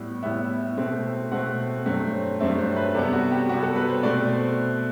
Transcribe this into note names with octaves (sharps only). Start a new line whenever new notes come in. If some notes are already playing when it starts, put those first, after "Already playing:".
Already playing: A2 G3 B3
A2 G3 B3 E5
B2 A3 C4
B2 A3 C4 F#5
G2 F#3 A3 C4
G2 F#3 A3 C4 E5
C5
B4
C3 G3 B3 A4
F#4
G4
C3 G3 B3 F#4
A4
B4
C5
B2 A3 C4 D5